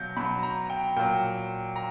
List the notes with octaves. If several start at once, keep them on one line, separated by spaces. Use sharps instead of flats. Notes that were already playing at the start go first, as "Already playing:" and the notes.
Already playing: B2 F#3 G6
B2 F#3 B5
A#5
G5
A#2 F#3 G5
A#5